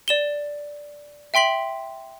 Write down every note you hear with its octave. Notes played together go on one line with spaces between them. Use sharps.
D5 E7 G7
E5 G5 C6 B6 F#7